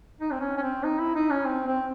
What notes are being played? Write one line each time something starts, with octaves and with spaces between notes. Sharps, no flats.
D#4
C4
C#4
C#4
C4
D#4
E4
D#4
C#4
C4
C4